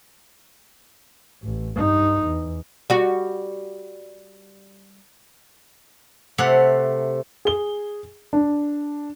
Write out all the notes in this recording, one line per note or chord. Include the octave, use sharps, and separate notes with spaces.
A1
G2 D#4
E2
G3 F#4
C3 A3 F#5
G#4 G7
D4